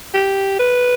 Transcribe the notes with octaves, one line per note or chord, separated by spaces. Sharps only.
G4
B4